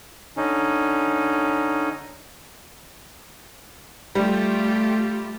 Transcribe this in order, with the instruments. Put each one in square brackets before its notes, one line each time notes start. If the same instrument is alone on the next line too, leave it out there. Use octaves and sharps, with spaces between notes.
[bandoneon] D3 C#4 D#4
[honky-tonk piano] G3 [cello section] A3 F4 G4